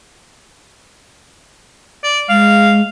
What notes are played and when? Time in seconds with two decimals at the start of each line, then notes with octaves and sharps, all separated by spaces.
2.04 D5
2.29 G#3 F5